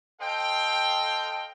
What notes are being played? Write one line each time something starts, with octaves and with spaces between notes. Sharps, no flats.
A4 C5 D#5 F5 G5